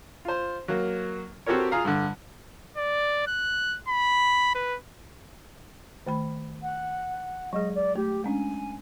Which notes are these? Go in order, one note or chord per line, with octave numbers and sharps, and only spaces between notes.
F4 C5
F#3 A#3
C4 F#4 G4 A4 A#4 C#5
F4 G#4 F5 A#5
G2 D3
D5
F#6
B5
B4
D#3 A3 B5
F#5
F#3 G#3 G#4 D#5
D5
A3 G4
G#3 C#4 D4 G#5